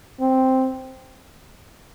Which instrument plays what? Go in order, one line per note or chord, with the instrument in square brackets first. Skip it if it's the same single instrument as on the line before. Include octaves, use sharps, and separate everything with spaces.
[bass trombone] C4